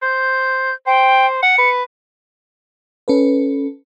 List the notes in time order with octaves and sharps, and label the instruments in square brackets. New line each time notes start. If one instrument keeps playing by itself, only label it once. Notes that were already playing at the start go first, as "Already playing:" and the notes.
[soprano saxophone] C5 [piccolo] G6
[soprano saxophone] C5 [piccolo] G5
[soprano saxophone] F#5 [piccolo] C#7
[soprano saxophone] B4
[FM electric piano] C#4 A4 B4